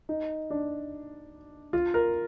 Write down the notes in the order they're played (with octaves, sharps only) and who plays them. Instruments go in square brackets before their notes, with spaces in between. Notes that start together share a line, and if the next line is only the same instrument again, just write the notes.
[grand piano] D#4
D4
F4
A#4